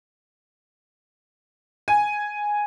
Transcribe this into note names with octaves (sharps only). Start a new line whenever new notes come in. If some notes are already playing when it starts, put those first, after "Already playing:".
G#5